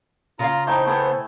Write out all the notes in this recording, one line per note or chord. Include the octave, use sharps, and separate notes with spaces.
C#3 F4 F5 A#5
A3 D#4 E4 C5 G5
A3 B3 G#4 A4